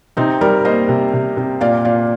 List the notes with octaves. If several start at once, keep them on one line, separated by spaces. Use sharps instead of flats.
C3 C4 D#4
G3 A#4 D5
A#3 C5 D#5
C3
C3
C3
A#2 D5 F5
A#2 D5 F5